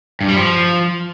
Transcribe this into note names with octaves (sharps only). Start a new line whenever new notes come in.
G2
G3
F3